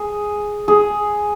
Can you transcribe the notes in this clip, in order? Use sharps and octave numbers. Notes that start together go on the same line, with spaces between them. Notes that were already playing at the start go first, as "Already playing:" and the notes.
Already playing: G#4
G#4